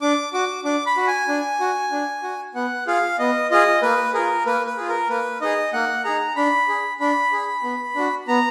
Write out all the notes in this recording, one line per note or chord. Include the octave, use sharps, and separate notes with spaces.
D4 D6
F#4 D6
D4 D6
B5
F#4
G#5
D4
F#4
D4
F#4
B3 F#5
F4 G#4 F5
B3 D#5
F4 G#4 D#5
A#3 B4
F4 G#4 A#4
A#3 B4
B4
F4 G#4
A#4
A#3 B4
D#4 G#4 D#5
A#3 F#5
D#4 G#4 A#5
D4 B5
G#4
D4 B5
G#4
B3
D4 F#4
B3 A#5